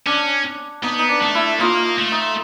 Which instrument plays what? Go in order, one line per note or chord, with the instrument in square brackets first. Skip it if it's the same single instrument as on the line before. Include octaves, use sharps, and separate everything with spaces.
[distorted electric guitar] C#4 [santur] D4
[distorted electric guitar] B3 [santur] D#4
[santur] D#4
D4
[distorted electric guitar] A3
[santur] E4
[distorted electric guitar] A#3 [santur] D#4 F4
[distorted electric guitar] A3
[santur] D#4